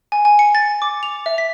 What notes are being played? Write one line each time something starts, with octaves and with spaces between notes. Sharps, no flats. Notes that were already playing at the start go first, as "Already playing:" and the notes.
G#5
G#5
C#7
A6
D6
F7
E5
B6